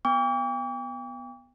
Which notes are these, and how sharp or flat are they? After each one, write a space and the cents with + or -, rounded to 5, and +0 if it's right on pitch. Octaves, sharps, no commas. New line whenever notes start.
B3 +0 G5 +35 D6 -45